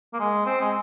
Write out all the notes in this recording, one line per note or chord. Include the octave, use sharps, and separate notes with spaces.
A#3
G#3
C4
G#3